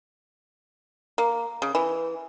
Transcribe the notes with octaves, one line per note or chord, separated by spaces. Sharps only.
A#3
C#3
E3